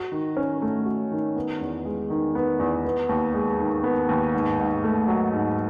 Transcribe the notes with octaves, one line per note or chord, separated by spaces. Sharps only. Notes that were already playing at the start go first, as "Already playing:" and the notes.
Already playing: F#4
D#3
C#4
A3
F#4
D#3
B3
E2
G#3
D#3
B3
E2
B3
D#2
G#3
D#3
B3
D#2
G#2
G#2
A3
F#3
G#2